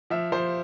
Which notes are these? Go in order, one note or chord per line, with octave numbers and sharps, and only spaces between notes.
F3 E5
F3 C5